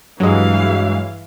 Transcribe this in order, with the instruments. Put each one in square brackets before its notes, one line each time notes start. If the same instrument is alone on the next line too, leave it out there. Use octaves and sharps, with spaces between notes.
[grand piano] G2 [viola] E3 F5 [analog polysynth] F#3 G#3